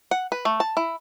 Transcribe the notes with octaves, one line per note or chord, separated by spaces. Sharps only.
F#5
B4
A3
A5
E4